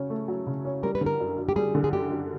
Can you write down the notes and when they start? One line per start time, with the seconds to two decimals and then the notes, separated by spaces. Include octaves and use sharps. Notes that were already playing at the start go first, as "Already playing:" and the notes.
Already playing: C#3 F#3 C#4
0.10 A3
0.28 F#3
0.46 C#3
0.65 C#4
0.83 G3 A#4
0.95 B4
1.01 D3
1.06 A#4
1.20 F#2
1.38 F#2
1.49 G4
1.56 G3 G#4
1.75 D3
1.84 G#4
1.93 F#2 G4
2.11 F#2